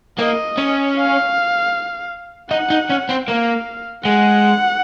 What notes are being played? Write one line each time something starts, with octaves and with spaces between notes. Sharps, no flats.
A#3 D#5
C#4
F5
D#4 F#5
D#4
C#4
C4
A#3 F5
G#3 F#5